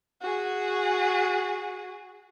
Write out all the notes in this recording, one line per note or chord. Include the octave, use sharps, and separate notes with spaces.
F#4 G#4